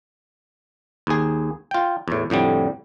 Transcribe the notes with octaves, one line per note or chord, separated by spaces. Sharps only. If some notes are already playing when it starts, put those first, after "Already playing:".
D#2 G#4
F4 G5
E2 A2
F2 A2 D3 G3